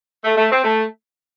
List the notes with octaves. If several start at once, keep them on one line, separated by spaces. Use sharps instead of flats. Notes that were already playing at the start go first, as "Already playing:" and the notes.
A3
A3
C4
A3